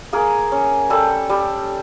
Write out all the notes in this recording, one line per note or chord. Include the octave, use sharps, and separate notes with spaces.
A#3 G#4 A#4
C#4
G3 G4 A4
G3